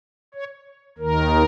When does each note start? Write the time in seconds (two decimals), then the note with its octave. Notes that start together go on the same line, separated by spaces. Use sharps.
0.34 C#5
0.98 D#2 D#3 A#4